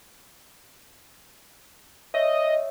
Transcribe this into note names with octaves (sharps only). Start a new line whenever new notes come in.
C#5 D#5 E5